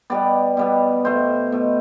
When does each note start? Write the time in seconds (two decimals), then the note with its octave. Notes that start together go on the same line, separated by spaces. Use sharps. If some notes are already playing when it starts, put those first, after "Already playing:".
0.10 B2 G3 B3 D5
0.57 B2 G3 B3
1.05 B2 A3 C5
1.52 B2 A3